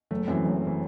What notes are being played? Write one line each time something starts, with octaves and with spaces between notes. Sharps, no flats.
F#1 A3
F#2 E3 C4
F#1
E3